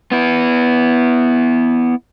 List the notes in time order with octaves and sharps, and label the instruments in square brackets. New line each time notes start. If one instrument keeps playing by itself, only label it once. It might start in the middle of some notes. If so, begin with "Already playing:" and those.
[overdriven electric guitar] B3 E4